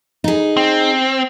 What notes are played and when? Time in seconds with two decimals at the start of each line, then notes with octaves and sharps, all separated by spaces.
0.24 D#4 G#4
0.57 C4